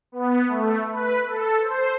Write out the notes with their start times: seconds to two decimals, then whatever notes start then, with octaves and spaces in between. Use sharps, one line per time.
0.12 B3
0.49 A3
0.91 B4
1.27 A4
1.62 C5